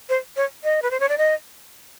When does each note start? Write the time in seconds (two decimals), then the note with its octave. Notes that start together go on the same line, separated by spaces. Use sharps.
0.09 C5
0.36 C#5
0.64 D#5
0.82 B4
0.91 C5
1.00 C#5
1.09 D5
1.18 D#5